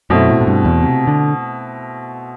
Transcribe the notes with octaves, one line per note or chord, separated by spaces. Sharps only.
F#2 B2 A3 C4 E4
A2
A2
G2
E2
C3
D3